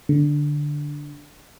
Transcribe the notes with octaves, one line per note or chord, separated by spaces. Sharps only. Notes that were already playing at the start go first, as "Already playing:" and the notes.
D3